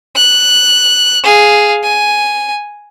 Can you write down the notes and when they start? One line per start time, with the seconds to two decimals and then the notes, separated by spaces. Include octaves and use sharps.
0.16 F#6
1.23 G#4 F5
1.83 G#5